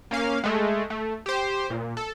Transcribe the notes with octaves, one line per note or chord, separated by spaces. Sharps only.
A#3 C#4 F5
G#3 A3
A3
G4 C5
A#2
A4